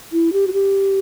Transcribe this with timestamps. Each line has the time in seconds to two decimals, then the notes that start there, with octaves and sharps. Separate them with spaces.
0.12 E4
0.33 G4
0.47 F#4
0.53 G4